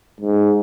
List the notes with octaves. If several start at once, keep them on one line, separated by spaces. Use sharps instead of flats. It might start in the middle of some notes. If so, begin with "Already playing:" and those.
G#2